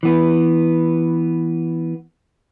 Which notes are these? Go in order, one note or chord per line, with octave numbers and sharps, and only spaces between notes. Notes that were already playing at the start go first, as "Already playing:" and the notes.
E3 B3